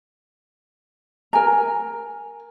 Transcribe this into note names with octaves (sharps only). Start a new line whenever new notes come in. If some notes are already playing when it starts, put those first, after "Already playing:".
A#4 G#5 A#5